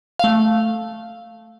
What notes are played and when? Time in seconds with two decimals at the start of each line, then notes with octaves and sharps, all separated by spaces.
0.19 A3 F5